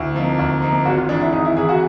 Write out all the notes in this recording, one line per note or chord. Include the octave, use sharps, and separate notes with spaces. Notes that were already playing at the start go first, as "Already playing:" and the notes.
Already playing: D2 E4
C3 F3 A#3 D#4
D2
C3 F3 A#3 D#4
G#1 F#4
F4
G#2 E3 D4
E4
G#1 D#4
E4
G#2 E3 G#4
F#4